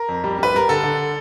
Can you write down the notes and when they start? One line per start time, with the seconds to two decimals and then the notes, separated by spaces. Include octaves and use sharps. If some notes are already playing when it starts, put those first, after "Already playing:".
Already playing: A#4
0.09 F2
0.24 G3
0.39 G3 B4
0.54 G3 A#4
0.69 D3 A4
0.84 D3